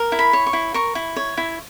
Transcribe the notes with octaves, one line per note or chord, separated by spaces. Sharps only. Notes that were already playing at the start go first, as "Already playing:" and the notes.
Already playing: A#4
E4
B5
C#5
C#6
E4
A#4 C#6
E4
C#5
E4